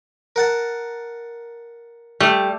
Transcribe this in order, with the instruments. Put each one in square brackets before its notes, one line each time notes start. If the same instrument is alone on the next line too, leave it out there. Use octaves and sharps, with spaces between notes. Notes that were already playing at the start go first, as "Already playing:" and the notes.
[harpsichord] A#4 F#5 A5
[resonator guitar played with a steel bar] G3 [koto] A3